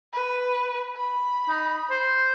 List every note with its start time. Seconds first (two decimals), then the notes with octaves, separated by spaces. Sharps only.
0.13 B4
0.97 B5
1.49 D#4
1.90 C5